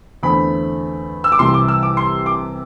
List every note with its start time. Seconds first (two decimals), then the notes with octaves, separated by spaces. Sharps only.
0.23 E2 D3 A3 C4 B5
1.24 E6
1.32 D6
1.39 C2 C3 E3 C6
1.54 D6
1.68 E6
1.83 D6
1.97 C6
2.26 D6